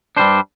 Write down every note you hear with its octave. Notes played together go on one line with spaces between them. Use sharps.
G2 G3 D4 C5